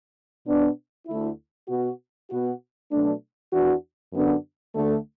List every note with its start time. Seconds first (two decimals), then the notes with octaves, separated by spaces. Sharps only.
0.46 B2 B3 D4
1.07 D2 D3 A3 E4
1.68 B2 B3 F#4
2.29 B2 B3 F#4
2.90 B2 F#3 A3 D4
3.51 E2 E3 D4 F#4
4.13 F#2 D3 B3 D4 F#4
4.74 D2 D3 A3